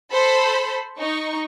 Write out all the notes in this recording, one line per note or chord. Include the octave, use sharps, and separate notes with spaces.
A4 C5 B5
D#4 C#6